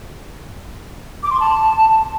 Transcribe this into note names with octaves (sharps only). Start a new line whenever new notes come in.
D6
C6
A5